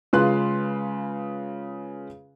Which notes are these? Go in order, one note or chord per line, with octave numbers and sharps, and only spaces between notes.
C#3 G#3 F4 B4 C6 F#6